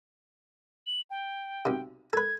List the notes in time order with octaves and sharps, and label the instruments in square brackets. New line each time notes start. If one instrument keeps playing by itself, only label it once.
[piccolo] F#7
G5
[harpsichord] B1 C3
[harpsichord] A4 B4 [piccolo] G#6